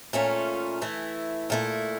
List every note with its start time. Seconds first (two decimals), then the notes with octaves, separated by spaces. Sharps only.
0.13 A#2 A3 C#4 F4
0.82 E3 A3 E4
1.50 A#2 A3 E4